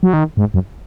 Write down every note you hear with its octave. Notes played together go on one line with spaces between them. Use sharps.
F#3
D#3
G#2
F#2